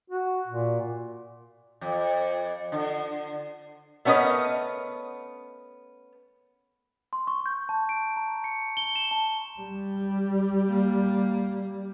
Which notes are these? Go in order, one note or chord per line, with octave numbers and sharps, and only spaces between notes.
F#4
A#2
F2
D3
A3 B3 C#4 A#4 D#5
C6
C#6
G6
A5
D7
A#5
C#7
G7
E7
A5
G3
A#3